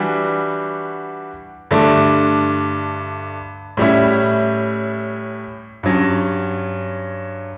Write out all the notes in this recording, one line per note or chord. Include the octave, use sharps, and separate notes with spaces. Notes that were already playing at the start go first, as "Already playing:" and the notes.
Already playing: E3 G3 D4 F#4
G2 D3 A3 D4
A2 G3 C#4 E4
G2 F#3 C#4